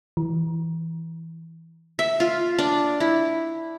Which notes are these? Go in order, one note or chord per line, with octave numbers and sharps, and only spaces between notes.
E3
E5
F4
D4
E4